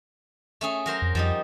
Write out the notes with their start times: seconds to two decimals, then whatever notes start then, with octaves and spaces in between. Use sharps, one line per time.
0.61 A3 C#4 G#4
0.86 F#3 A#4 C5
1.02 F2
1.15 F2 F3 G3 D#4